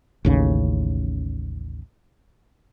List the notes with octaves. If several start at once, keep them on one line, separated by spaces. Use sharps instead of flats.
A1 D#2 C#3